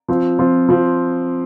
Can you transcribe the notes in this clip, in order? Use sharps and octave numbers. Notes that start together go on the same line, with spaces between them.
F3 C4 F4
F3 C4 F4
F3 C4 F4